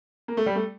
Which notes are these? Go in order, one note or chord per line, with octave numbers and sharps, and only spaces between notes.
A#3
A3
G3
A3